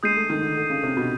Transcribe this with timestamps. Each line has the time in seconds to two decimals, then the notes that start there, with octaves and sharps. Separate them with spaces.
0.03 G#3 D#6 G6 C7 D#7
0.16 A3
0.30 D#3
0.42 D3
0.57 D3
0.70 C#3
0.83 C3
0.97 B2